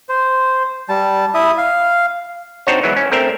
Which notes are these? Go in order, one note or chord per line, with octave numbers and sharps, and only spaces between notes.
C5
G3 A5
E4 E5 D#6
F5
C4 D4 D#4 F#4 C5 C#5
E3 F#3 G#3 B3 E4
C#4
A3 C4 D4 A#4 E5